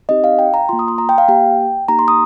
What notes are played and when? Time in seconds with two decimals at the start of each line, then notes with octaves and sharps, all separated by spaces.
0.09 C4 D#4 G4 D#5
0.24 F5
0.39 G5
0.54 A#5
0.69 A#3 F4 C6
0.79 D#6
0.88 C6
0.98 A#5
1.09 G5
1.18 F5
1.28 A#3 G4 G5
1.88 A#3 D#4 G4 A#5
1.99 C6
2.08 D#6